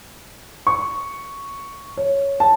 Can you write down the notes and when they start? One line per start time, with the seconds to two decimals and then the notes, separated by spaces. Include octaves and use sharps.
0.67 C#6
1.97 C#5
2.40 A5